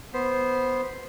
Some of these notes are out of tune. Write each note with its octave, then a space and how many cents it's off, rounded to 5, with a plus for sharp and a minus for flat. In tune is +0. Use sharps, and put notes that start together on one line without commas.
B3 +0 C5 +0